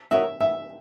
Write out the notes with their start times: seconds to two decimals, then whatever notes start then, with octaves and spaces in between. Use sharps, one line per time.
0.11 D#4 F#4 A#4 C#5 E5
0.40 B3 E5